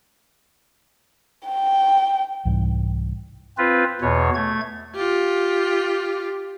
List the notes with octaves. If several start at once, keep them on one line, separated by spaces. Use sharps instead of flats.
G5
C2 G#2 E3 G3
C4 F4 B4
E2 B2 C#5
A3 G#6
F4 G4